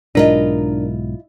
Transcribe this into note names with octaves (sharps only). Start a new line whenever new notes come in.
B1 G#2 D4 E4 F4 A#4 D#5